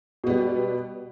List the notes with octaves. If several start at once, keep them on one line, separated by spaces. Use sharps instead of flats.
B2 G3 B3